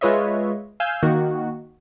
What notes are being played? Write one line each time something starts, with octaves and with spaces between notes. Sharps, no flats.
G#3 F4 B4 C#5 D#5 E5
F5 G#5 E6 G6
D#3 A#3 F#4